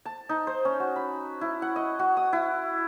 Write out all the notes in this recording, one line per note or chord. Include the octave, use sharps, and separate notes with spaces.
A5
D#4
C5
C#4
F#4
B5
E4
F#5
D#5
F#4
D#6
E4